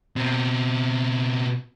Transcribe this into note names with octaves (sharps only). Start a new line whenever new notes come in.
B2 C4